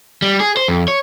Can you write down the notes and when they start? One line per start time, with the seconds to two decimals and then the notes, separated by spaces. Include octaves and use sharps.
0.22 G3
0.40 G#4
0.57 C5
0.68 F2
0.88 C#5